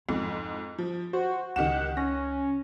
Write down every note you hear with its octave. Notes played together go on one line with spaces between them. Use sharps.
F2 G#2 E4
F3
F#4 C5
C#2 D#3 G4 F#5 E7
C#4 A#6